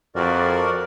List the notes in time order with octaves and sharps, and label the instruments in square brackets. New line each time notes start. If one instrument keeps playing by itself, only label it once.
[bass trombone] F2 [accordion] F#4 A#4 D5